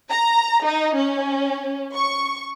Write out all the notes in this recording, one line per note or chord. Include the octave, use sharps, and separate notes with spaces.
A#5
D#4
C#4
C#6